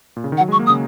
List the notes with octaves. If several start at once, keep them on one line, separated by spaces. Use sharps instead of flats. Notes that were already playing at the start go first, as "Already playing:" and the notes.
A#2
C#3
D#3
F#5
F#3
G#3
C#6
A#3
D#6
C#3